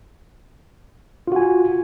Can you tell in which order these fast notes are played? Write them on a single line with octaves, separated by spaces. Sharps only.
F4 F#4 G#5